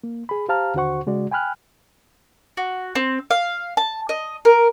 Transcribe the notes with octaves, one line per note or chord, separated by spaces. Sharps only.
A#3
G#4 B5
G4 C5 F5 A5 A#5 F6
D#2 D3 F#4 C5 F#5 C#6
C#3 G#3 F#4 D5
G5 G#5 B5 F6 F#6
F#4
C4
F5
A5
D#5
A#4